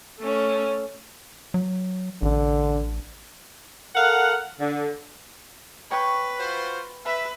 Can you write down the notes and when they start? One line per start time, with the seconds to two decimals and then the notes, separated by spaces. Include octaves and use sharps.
0.20 A3 C#4
1.54 F#3
2.22 A1 D3
3.96 A4 A#4 F5 F#5
4.59 D3
5.91 B4 C#5 G5 C#6
6.38 F4 F#4 C5
7.05 B4 E5